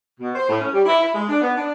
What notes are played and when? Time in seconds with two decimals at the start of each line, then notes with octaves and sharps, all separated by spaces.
0.20 B2
0.35 C5
0.48 A2
0.61 C#4
0.73 G3
0.86 E4
1.00 E4
1.14 G#3
1.29 D4
1.41 B3
1.57 D4